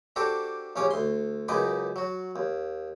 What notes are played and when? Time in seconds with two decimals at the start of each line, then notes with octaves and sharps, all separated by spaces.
0.16 D4 F#4 G4 A4 C5 D6
0.76 A#1 D#2 C#4 C#5 G#5 D6
0.91 D2 C6
1.48 C#2 F#2 D#4 B4 G#5 D6
1.96 F#3 F#4
2.36 D#2